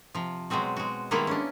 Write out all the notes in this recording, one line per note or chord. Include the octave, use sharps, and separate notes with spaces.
C3 F3
B2 F#3 G#3 C4 F#4
G#3 F#4
D#3 G3 G#3 A#3 B3 E4
C#4 D4